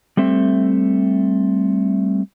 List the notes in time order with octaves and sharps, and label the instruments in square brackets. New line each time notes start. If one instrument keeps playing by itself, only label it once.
[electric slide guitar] G3 A3 C4 E5